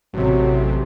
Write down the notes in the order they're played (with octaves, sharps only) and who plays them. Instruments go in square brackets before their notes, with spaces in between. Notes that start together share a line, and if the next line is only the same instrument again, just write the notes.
[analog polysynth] A1 C3 [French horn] F#3